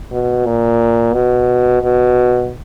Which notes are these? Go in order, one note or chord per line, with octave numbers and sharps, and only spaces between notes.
B2
A#2
B2
B2